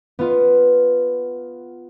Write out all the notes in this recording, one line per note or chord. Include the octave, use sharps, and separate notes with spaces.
B3 F4